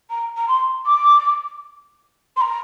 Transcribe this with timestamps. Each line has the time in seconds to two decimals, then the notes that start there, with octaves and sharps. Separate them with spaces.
0.10 A#5
0.37 A#5
0.48 C6
0.86 D6
2.36 C6
2.41 A#5